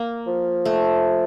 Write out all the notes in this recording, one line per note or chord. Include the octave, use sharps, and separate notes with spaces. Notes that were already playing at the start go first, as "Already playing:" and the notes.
Already playing: A#3
F3
A3